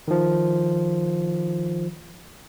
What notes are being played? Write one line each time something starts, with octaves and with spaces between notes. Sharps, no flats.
D#3 F3